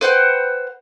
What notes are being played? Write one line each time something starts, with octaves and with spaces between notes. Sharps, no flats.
B4 C5 F#5 G5